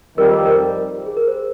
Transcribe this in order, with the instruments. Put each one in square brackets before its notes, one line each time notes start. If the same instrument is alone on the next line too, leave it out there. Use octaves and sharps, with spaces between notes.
[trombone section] F2 D#3 G3 [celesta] A#4
[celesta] C5
A#4
G#4
A#4
C5